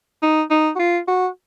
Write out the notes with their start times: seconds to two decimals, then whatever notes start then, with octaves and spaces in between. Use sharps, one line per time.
0.23 D#4
0.50 D#4
0.76 F#4
0.79 F4
1.08 F#4